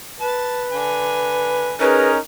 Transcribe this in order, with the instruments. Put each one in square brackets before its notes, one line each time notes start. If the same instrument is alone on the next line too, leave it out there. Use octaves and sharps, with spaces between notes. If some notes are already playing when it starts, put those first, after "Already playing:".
[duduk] B4 [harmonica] A5
[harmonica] D3 G#5
[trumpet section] C#4 D#4 A#4 [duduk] G#4 [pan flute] B4